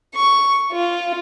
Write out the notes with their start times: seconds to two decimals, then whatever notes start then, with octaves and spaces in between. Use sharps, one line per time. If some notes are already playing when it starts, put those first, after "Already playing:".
0.15 C#6
0.73 F4